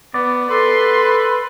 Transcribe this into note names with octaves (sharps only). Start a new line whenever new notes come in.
B3 D5
A4 B4 C6